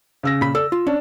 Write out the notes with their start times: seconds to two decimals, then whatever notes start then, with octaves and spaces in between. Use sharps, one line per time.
0.23 C#3 E6 A#6
0.41 A#2 B5
0.55 A4 D5 E6
0.72 F4
0.87 C#4 D4